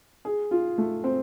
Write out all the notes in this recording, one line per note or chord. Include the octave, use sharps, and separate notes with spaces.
G#4
F4
A3
C4